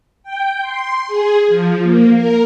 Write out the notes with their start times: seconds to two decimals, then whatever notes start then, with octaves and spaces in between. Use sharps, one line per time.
0.23 G5
0.61 C6
1.07 G#4
1.48 F3
1.83 A#3
2.14 A#4